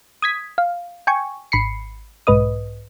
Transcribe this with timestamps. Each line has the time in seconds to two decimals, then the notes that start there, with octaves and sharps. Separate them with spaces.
0.22 D#6 G#6 B6
0.58 F5
1.07 G5 G#5 C#6
1.52 G#1 B5 C7 C#7
2.27 B1 G#2 B4 D#5 D#6